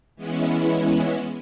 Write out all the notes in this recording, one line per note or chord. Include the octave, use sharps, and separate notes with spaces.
E3 G#3 B3 C#4 E4